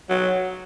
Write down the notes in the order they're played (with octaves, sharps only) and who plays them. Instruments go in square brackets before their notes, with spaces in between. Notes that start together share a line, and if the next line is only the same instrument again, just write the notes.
[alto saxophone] F#3